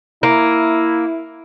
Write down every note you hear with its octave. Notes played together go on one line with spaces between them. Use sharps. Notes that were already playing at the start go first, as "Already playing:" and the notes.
A#3 E4